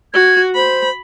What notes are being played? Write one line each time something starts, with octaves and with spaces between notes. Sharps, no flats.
F#4 G#6
C5 B5